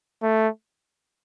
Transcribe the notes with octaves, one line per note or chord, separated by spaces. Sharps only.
A3